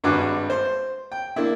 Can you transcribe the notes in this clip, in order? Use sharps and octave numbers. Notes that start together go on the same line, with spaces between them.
G#1 G2 G#3 F#4 B4 D6
C5
G5
A#3 D4 E4